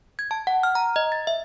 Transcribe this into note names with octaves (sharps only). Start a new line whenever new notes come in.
G#6
A5
F#5
F6
A#5
D#5
A6
E5